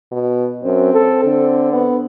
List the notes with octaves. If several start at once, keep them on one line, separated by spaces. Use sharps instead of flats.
B2
F#2 C4
A4
D3
B3